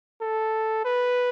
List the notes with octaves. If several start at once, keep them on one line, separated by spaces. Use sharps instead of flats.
A4
B4